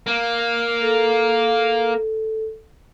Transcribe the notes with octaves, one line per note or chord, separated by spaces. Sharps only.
A#3
A4